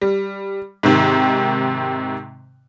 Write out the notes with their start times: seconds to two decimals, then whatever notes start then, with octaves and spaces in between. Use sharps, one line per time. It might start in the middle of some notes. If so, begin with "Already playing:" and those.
0.01 G3
0.83 G#2 C3 D#3